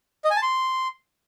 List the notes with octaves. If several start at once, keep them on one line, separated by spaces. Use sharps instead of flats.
D#5
G#5
A5
C6